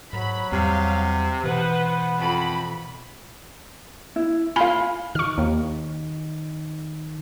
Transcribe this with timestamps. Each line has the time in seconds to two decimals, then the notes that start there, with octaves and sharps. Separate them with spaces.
0.13 G#2 F#3 B5
0.52 E2 C3 G3 F5
1.44 B2 E3 B3 B4 C5 F#5
2.20 F2 B5
4.16 E4
4.56 F4 F5 G#5 B5
5.15 D#3 C#6 F6
5.38 D#2